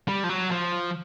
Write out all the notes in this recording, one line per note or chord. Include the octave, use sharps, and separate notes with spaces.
G3
F3
F#3
F3